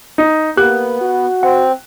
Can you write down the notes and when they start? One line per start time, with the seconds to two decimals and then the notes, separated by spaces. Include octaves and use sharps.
0.18 D#4
0.57 A#3 B3 G4 F#6
1.01 F#4
1.43 C4 F#5